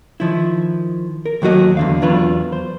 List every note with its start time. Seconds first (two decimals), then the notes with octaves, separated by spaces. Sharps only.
0.20 D#3 F3 E4
1.26 A#4
1.42 D#2 F#3 A3 F#4 D#5
1.77 E2 D3 F5
2.02 E2 F#3 D4 F4 B4
2.52 C5